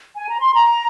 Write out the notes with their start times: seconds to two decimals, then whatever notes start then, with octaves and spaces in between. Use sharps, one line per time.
0.16 G#5
0.28 A#5
0.40 C6
0.53 A#5